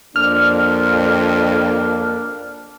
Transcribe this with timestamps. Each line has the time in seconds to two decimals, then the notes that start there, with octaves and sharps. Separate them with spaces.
0.16 F2 A#3 D4 F6